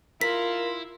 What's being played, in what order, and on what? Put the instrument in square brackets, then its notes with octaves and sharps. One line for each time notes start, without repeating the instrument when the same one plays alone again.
[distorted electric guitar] E4 [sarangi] F4 [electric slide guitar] A#4 [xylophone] B6